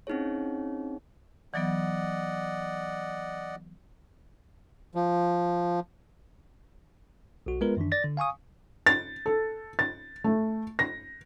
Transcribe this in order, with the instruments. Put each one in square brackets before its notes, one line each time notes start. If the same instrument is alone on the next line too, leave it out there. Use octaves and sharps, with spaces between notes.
[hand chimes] C4 C#4 D#4 E4 G#4 C#5
[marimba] E3 F#3 B3 [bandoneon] D5 D#5 F#5
[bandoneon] F3
[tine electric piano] B1 F#4
G#3 B3 F4 A#4 B4
F#2 D#3 E3 D4
D5 A6 A#6
D3
F5 G#5 C#6 D#6
[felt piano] A6
A4
A6
A3
A#6